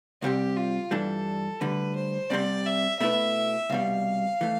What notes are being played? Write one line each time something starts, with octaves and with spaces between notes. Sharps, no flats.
C2 C3 G3 C4 G4
F4
G2 E3 G3 D4 A4
D2 D3 G3 B4
C5
C2 C3 G3 C4 D5
E5
B2 A3 E4 B4 E5
C2 B2 G3 F5
E3 A3